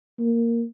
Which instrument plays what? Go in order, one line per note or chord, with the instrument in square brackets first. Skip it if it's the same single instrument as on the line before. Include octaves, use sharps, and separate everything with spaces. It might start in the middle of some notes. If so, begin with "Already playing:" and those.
[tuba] A#3